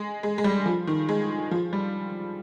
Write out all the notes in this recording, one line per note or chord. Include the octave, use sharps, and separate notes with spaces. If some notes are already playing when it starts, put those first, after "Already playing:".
Already playing: G#3
G#3
G#3
G3
F3
D#3
G#3
F3
G3